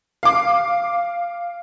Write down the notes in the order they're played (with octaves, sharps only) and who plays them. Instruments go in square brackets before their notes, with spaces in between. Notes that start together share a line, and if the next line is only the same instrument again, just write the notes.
[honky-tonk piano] F5 D6